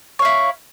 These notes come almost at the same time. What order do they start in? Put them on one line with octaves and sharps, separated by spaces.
C#5 F5 E4